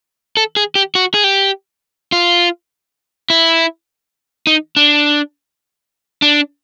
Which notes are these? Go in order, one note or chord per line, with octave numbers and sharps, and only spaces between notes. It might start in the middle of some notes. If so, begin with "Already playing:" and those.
A4
G#4
G4
F#4
G#4
G4
F4
E4
D#4
D4
D4